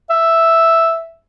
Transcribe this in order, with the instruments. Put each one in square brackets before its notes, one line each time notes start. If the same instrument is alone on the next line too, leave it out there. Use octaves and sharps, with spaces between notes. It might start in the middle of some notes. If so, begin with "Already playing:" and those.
[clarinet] E5